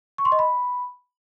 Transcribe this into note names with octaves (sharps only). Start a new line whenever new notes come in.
C#6
C6
D#5
B5